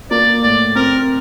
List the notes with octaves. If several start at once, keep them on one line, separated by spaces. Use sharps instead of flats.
A#3 D5
A2 D5
C4 A#4